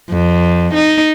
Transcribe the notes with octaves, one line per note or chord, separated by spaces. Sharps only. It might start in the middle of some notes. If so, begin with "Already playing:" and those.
F2
D#4